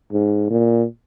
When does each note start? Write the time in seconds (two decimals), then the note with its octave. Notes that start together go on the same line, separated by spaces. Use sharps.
0.12 G#2
0.50 A#2